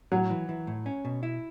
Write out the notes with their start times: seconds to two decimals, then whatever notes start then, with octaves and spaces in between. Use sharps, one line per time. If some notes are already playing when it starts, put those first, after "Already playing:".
0.12 A2 F#3
0.30 E3
0.49 E3
0.67 A2
0.86 C#4
1.05 B2
1.23 E4